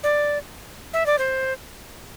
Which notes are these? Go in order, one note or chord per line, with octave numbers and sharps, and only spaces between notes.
D5
E5
D5
C5